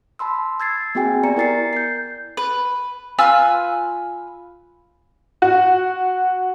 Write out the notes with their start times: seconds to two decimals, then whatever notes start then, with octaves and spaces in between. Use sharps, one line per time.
0.19 A5 B5 C6 E6
0.60 E6 G#6 A6 C7
0.95 A#3 C4 F#4 G#4 G5 G#5
1.23 B3 G4 D5 A#5 C#7
1.36 E4 A#4 D5 A6 C7 C#7
1.73 G6 C7
2.37 B4
3.19 F4 B4 G#5 E6
5.42 F#4